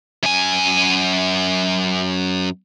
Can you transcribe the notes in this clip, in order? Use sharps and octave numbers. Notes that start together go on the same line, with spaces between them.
F#2 G#5